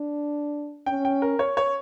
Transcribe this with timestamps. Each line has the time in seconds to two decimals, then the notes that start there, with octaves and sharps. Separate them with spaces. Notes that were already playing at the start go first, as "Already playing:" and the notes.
Already playing: D4
0.86 C#4 G5
1.05 G5
1.22 A#4
1.39 C#5
1.57 C#5